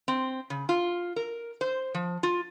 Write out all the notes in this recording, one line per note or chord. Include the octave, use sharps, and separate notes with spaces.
C4
C#3
F4
A#4
C5
F3
F4